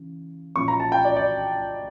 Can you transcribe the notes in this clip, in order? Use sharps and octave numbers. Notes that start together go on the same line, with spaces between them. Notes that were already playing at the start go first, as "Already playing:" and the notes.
Already playing: C#3 E3
A#2 F3 C#4 C#6
A#5
A5
G5
D5
D5